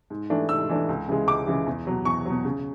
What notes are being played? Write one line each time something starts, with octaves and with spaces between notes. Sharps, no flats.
G#2
E3 A3 D4
G#2 E6
E3 A3 D4
C#2
C#3 E3 G#3
C#2 D6
C#3 E3 G#3
E2
B2 F#3
E2 C#6
B2 F#3
C#3